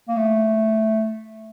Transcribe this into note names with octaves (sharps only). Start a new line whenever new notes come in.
A#3
A3